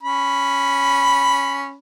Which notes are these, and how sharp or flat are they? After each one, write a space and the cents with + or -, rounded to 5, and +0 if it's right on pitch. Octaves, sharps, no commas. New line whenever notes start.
C#4 +0 B5 +0